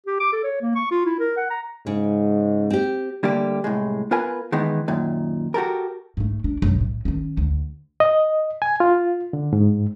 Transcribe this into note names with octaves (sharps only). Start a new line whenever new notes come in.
G4
D6
A4
C#5
A#3
C#6
F4
E4
A#4
F#5
A#5
G#2 C#3
C4 G4
D3 G3 A3 A#3 G4
C2 A2 G#3
B3 F4 A#4 B4 G#5
D#3 E3 G#3 B3
F#2 A#2 D#3
F#4 G4 A4 A#4
G#2 A3
D4
B1 F#2
A2
D#3 C#4
D2
D#5
G#5
F4
D3
G#2